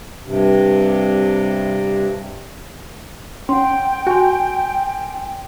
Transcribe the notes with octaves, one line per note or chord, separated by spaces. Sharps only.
G2 C3
C#4 F#5 G5 C6
F#4 G#5 C6